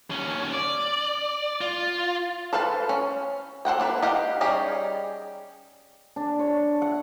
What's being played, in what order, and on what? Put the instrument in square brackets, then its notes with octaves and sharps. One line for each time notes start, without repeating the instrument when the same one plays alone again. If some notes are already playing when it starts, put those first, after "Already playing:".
[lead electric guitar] D#2 C#4
D5
F4
[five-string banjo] A4 B4 C5 F5 A5
C#4
A4 C5 F#5 G5
A#3 D4 B4
G4 D#5 F5 F#5
G3 C#4 D#4 G4 G#4
[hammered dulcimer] D4
C#5
F#5